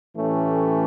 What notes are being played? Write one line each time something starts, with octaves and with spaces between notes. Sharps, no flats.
A2 E3 A3 C#4 G4